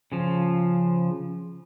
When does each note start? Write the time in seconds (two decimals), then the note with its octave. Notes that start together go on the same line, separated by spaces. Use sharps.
0.12 C#3 F3